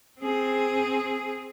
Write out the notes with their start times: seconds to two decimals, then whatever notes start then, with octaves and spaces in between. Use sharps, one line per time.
0.20 C4 G#4